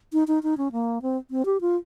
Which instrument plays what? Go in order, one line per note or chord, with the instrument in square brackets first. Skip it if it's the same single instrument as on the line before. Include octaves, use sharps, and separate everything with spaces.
[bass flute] D#4
D#4
D#4
C#4
A#3
C4
C4
G4
F4